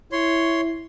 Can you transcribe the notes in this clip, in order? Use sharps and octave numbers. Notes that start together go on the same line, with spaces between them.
E4 C#5 C6